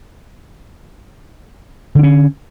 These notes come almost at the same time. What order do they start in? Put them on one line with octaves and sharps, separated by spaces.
D3 D4 C#4